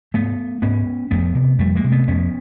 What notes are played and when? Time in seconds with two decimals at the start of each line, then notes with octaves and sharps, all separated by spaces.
0.14 G#2 A3 B3
0.62 G#2 B3 C#4
1.11 F2 A3 B3
1.35 C3
1.59 F2 G3 A3
1.76 G#3 A#3
1.84 C3
1.92 A3 B3
2.08 F2 B3 C#4